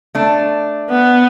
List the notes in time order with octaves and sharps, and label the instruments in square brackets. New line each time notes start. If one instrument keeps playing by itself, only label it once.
[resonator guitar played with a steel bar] A3 D4
[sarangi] B3